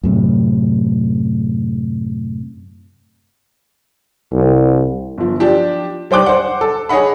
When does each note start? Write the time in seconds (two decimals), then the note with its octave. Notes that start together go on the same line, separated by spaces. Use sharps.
0.03 F#2 A2 C3
4.32 C2
5.18 G1 F3
5.40 F3 D4 G4
6.11 G3 C5 G5 D6 F#6
6.26 C5 F#5
6.61 A4
6.89 G#4 C#5 D#5 F#5 B5